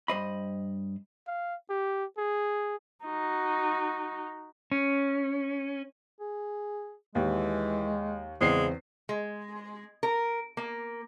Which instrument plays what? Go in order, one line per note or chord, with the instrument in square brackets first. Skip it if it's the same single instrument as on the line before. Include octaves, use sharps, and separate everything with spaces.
[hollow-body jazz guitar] G2 C5 D#5 B5
[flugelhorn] F5
G4
G#4
[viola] D#4 F#4
[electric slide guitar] C#4
[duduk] G#4
[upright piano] D#2 [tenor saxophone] E3 [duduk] G#3
[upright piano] E2 C4 C7 [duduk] C#3 [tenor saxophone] G#3
[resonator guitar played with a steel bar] G#3
A#4
A#3